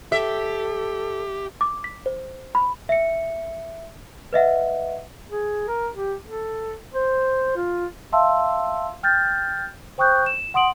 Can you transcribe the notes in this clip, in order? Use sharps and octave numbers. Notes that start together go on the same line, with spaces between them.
G4 A4 E5
D6
B6
C5
B5
E5 C#7
B4 D#5 E5 F#5
G#4
A#4
G4
A4
C5
F4
E5 F5 A5 C6 E6
G5 F6 G6 A6
C5 G5 C#6 D#6 F#6 G6
E7
F#5 C6 D#6 D7 F#7